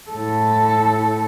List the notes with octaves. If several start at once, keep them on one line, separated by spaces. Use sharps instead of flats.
A2 A4